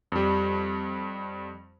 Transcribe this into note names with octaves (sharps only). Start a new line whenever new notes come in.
F2 G3